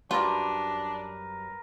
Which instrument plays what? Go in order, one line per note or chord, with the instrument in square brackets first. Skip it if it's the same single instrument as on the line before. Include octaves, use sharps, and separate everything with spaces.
[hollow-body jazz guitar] F#2 G3 [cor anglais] D4 [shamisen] F4 [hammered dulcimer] A#4 B4